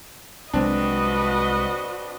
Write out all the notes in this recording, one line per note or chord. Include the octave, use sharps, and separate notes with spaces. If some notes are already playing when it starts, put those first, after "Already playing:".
C2 F#3 G#3 C4 D4 F#4 B4 D#5